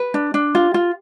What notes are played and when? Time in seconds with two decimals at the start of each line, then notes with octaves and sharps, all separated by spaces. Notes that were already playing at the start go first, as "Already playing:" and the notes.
Already playing: B4
0.14 D4
0.34 D4
0.55 F4
0.74 F4